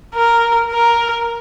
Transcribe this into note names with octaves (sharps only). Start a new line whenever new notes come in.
A#4
A#4